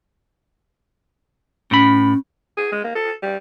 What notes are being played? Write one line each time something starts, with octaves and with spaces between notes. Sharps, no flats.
A2 C#4 B5
G#4
G#3
A#3
A4
G3